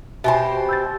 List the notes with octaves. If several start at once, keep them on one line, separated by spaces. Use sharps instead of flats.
B2 G4 C5 E5 G#5 B5
E6 G6 A6